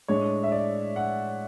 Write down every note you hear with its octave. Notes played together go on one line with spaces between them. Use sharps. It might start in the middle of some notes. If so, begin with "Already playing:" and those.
A2 G#3 D4 C#5
E5
D5
F#5